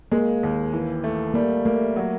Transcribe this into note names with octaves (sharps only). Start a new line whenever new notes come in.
G#3 A#3
D#2
E3
A3
G3 A#3
A3 A#3
F#3